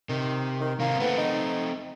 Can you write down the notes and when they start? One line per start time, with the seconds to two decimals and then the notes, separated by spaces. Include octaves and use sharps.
0.09 C3 D#3
0.61 D#3
0.80 C3 D#3 A#3
1.00 A3 B3 C4
1.18 D#4